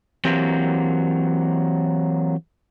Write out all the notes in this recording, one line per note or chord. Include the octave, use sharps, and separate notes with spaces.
E3 F#3 A#3 C4 G4